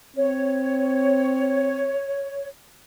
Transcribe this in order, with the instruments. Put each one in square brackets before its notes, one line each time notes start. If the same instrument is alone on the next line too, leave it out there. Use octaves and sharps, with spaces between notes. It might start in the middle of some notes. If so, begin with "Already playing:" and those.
[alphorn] C4 [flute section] C#5